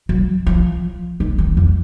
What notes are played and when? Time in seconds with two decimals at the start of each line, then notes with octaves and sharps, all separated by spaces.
0.09 F#3
0.46 F3
1.20 D#3
1.38 D#3
1.57 F2